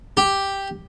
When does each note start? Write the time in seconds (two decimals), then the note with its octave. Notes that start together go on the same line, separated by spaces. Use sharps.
0.17 G4